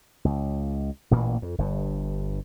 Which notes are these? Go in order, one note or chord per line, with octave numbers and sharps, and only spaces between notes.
C#2
A1 A#2 E3 A#3
F2
G1 G2